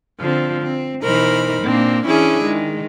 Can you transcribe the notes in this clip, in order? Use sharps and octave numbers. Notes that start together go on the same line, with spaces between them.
D3 F3 C4
C4
B2 E3 D#4 A#4 C5 B5
A#2 A#3 C4 D4
E3 C#4 D4 E4 G#4
D#3 G#3